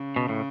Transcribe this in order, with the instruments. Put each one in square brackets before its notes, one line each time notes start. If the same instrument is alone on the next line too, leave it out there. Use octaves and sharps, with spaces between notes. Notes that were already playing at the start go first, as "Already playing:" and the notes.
Already playing: [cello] C#3
[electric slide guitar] B2
A2